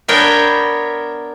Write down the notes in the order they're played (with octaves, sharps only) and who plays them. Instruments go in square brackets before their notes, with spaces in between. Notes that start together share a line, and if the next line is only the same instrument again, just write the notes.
[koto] B3 D4 A#4 C#5 E5 G5